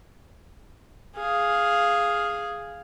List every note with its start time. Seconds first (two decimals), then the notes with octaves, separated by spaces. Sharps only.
1.16 G#4 F5